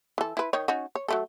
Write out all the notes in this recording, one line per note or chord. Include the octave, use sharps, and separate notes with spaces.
E3 A4
E4 B4
D#3 D#4 C#5
C#4 D#4 F#4
C#5
F#3 A3 A4